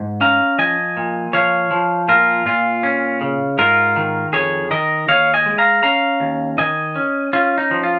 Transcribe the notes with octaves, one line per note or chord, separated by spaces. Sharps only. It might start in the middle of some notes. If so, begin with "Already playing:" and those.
Already playing: G#2
C#4 F5 A#5
F3 D#5 G#5
A#2
F3 C#5 F5
F3
A#2 F4 A#4
A#2 F4
C#4
C#3
G#2 F4 A#4
D#3
F2 G#4 C#5
D#3 A#4 D#5
D#2 C#5 F5
D#5 G#5
G#3
F5 A#5
C#4 F5 A#5
D#2
D#3 D#5 G#5
C#4
C#4 F4
D#4
F3
F4